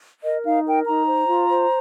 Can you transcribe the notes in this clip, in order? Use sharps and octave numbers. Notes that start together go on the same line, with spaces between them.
A#4 D#5
D#4 F5
A#4 G5
D#4 A#5
C5
F4
C5